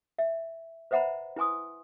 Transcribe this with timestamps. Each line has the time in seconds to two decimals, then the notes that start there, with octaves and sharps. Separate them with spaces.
0.19 E5
0.91 B4 C5 E5 F#5 A#5 B5
1.36 E4 B4 G#5 C6 D#6